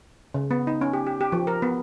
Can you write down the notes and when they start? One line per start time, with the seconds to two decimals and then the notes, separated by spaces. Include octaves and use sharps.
0.34 C#3
0.51 B3
0.67 D#4
0.81 C#4
0.93 G4
1.07 G4
1.21 G4
1.32 F3
1.47 A#4
1.62 B3